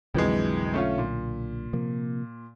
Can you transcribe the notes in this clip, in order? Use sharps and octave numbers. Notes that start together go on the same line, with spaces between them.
B1 F2 D3 E3 F#3 G#3
A3 C#4 F4
A#2
C3 F3 A#3